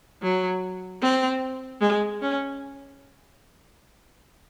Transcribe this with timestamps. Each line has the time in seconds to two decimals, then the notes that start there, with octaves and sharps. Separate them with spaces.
0.23 F#3
1.02 C4
1.82 G#3
2.22 C#4